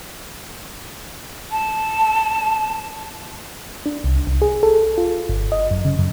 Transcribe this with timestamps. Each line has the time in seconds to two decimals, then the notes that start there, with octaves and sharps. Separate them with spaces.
1.52 A5
3.86 D4
4.04 C2
4.27 C2
4.42 G#4
4.63 A4
4.98 F4
5.29 G1
5.52 D#5
5.71 F#2
5.85 C#3
5.99 F#2